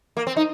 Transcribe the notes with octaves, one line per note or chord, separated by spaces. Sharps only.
A#3
C4
D#4